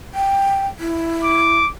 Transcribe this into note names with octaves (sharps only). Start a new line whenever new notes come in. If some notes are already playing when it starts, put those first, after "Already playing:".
G5
E4
D6